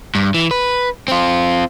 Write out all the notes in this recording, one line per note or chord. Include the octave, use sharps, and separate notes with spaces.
G2
E3
B4
C4 F4